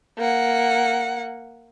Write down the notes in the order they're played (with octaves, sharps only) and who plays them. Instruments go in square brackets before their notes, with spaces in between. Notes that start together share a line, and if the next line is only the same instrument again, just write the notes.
[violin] A#3 F#5